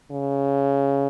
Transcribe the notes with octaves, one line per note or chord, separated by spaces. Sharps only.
C#3